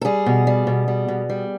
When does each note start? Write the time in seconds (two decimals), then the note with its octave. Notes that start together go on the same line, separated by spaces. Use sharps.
0.01 A4
0.05 G3 G#4
0.26 B2
0.47 G3
0.67 B2
0.88 G3
1.08 B2
1.29 G3